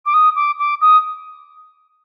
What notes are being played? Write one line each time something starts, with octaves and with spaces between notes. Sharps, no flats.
D6
D#6
D6
D6
D#6